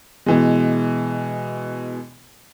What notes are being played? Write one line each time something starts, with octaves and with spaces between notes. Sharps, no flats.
B2 E3 G#3